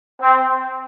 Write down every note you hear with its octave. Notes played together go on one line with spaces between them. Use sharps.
C4